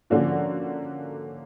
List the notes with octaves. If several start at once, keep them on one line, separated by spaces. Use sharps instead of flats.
D3 F3 A#3 C#4 F#4